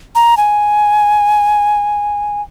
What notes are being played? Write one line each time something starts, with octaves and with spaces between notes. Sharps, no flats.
A#5
G#5